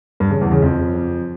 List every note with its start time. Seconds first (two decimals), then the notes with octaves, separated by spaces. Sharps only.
0.20 G2
0.31 C#3
0.41 E2
0.52 C#3
0.62 F2